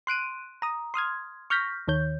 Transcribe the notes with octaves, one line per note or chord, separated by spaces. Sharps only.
C6 F#6 D7 D#7
A#5 D#6
C6 D#6 F6 G#6
C#6 F6 G6 A#6 B6
D#2 D#3 C#5 G6